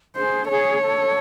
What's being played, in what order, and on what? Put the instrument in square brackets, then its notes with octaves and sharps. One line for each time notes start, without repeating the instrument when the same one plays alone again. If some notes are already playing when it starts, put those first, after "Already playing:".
[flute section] G#4 [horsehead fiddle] C5
[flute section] A4
[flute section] G#4 [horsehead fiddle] C#5
[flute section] A4